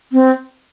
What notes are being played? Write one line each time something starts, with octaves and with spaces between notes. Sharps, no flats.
C4